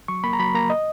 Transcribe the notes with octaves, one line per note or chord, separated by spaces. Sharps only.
F#3 C#6
A#3 B5
A#5
F#3 B5
A#3 A#5
D#5